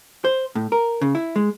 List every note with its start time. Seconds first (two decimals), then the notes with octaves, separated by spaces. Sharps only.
0.25 C5
0.55 A2
0.72 A#4
1.01 C#3
1.15 E4
1.36 G#3